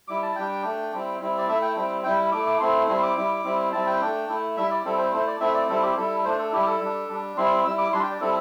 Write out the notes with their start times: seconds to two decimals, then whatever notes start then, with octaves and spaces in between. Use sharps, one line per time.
0.08 G3 E4 D6
0.23 A5
0.36 G3 D4 G5
0.64 A3 D4
0.93 G3 C4 E4
1.21 G3 C4 E4
1.38 D5
1.48 A3 E4 E5
1.62 G5
1.76 G3 C4 E4
2.04 G3 E4 G5
2.32 A3 E4 D6
2.46 D6
2.60 A3 C4 E4 C6
2.88 G3 C4 E4 C6
3.03 D6
3.17 G3 E4
3.44 G3 C4 E4
3.72 G3 C4 E4 A5
3.87 G5
4.01 A3 D4
4.29 A3 E4
4.57 G3 E4 E5
4.71 D5
4.85 G3 C4 E4 A4
4.98 C5
5.12 A3 E4 C5
5.27 D5
5.41 A3 C4 E4 E5
5.54 D5
5.69 G3 C4 E4 A4
5.83 G4
5.97 G3 E4 A4
6.25 A3 D4 C5
6.39 A4
6.52 G3 E4 G4
6.67 A4
6.80 G3 D4
7.08 G3 D4
7.37 G3 C4 E4 C6
7.65 G3 E4 E6
7.78 D6
7.92 G3 D4 C6
8.03 G5
8.11 D5
8.21 G3 C4 E4 A4